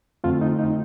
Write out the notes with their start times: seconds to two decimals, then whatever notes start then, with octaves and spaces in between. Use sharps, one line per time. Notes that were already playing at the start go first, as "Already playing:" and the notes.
0.24 F2 D3 A3 C4 F4
0.41 D#4
0.59 D#4